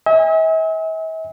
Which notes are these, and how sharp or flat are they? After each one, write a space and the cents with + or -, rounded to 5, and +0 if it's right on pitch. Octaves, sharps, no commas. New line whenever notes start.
E5 -45 G#5 -30